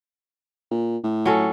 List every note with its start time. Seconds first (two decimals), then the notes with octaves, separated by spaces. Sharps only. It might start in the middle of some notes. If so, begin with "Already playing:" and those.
0.71 A#2
1.04 A2
1.26 F#3 C#4 A4